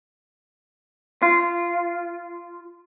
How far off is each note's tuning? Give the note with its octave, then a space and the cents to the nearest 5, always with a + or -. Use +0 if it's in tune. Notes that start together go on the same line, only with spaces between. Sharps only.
F4 -15